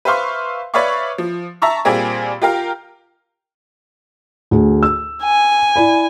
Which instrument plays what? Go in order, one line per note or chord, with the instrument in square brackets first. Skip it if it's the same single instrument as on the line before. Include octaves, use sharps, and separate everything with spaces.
[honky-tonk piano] B4 C5 E5 F5 C6 C#6
B4 C#5 D5 E5 F5 C#6
F3
E5 A5 A#5 C#6 E6
A#2 G3 A#3 C4 G#4
F4 G4 A#4 F5
[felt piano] D2 G#4
E6
[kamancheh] G#5
[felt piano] E4 D5 B5